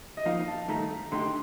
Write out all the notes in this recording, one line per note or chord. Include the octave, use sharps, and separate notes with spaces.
D#5
F3 A#3 D#4 F5
A5
G2 D#3 A3 D#4 A#5
D3 A3 D#4 G4 C6